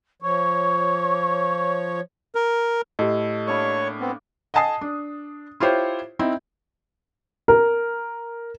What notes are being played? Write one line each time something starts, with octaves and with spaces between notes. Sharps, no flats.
F3 C#5 C#6
A#4
A2 G4 A4 D#5
A#3 D4 C#5 B5 C#6
B3 C4
D#5 F#5 G#5 A5 D#6 C7
D4
E4 F4 G4 C5 C#5
C4 D#4 E4
A#4